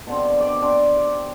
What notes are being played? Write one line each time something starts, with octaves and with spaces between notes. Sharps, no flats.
B2 D3 C4
D5
C4 D4 D6
G4